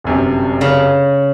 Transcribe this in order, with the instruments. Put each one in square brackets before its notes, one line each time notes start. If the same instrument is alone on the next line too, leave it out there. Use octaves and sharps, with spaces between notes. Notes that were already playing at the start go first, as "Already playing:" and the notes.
[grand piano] G1 F#2 C3
[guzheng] C#3